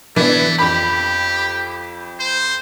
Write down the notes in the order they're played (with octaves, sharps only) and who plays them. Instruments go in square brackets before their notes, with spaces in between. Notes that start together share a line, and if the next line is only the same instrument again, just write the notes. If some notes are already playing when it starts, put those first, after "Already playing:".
[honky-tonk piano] E3 B3 D4 [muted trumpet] A3
[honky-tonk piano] F2 B5 [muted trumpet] G4
[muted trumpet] C5